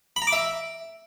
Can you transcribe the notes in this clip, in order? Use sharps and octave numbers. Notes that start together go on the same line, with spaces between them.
B5
A#5
D6
E5